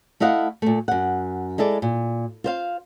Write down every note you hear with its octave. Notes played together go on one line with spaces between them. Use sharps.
A3 E4 D#5 F5 F#5
A#2 A3
F#2 F#5
G#3 E4 A4 D5
A#2
F4 C5 F5